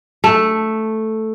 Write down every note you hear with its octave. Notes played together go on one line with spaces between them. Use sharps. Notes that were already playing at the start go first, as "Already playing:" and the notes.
A3